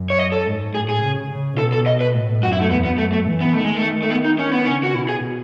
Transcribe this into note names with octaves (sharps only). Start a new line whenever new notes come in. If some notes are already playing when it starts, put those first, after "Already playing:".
Already playing: F#2
C#5
D#5
A4
G#2
A2 G#4
G#4
C#3
C#3
B2 A4
A4
D#5
B4
A2
F#2 F#4
E4
A3
E2 B3
B3
F#2 A3
A3
E3
B3
D#3 A3
G#3
A3
A3
B3
D#4
C#4
B3
C#3 C#4
F#4
B2 E4
G#4